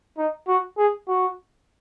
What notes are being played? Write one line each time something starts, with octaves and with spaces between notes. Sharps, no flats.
D#4
F#4
G#4
F#4